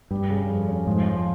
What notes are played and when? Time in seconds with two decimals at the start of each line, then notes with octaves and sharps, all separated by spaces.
0.11 G2 G3
0.30 C#3
0.49 F2
0.68 C#4
0.87 G#2 F3
1.06 F3